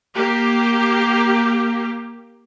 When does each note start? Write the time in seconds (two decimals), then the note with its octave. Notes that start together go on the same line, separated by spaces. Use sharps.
0.15 A#3 G4